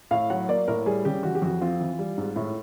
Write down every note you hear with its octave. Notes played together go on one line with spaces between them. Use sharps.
A2 F5
F#3 F#5
A#3 D5
A2 A#4
G3 G#4
C#3 G4
E3 F#4
G4
F2 F#4
C4 F4
E3
G3
G#2
A2